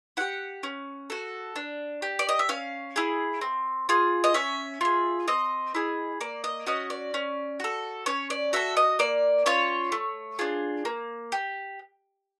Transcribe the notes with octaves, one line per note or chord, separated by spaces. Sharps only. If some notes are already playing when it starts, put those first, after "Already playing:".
E4 G4 F#5
C#4
F#4 A4
D4
G4
D5
D#5
E5
C#4 F5
E4 G#4
C4
F4 G#4
D#5
C#4 E5
F4 G#4
C4 D#5
E4 G#4
A#3 D5
D#5
C#4 F#4 D#5
D5
C#4
F#4 A4
C#4 C#5
D5
F#4 A4 E5
D#5
A#3 D5
C#4 F4 C#5
A3
D4 F4 G#4
A#3
G4